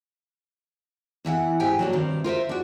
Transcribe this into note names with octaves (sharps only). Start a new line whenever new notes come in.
E2 E3 E5 F#5
G#2 G4 G5 G#5
F#3 A#3 D4
G2 C3 D#3
F4 A#4 C5 E5
D4 F#4